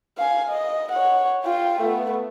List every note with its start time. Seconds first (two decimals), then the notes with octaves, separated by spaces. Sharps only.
0.18 F5 G#5
0.49 D#5
0.92 C#5 F#5
1.44 F4 G5
1.81 A3 B3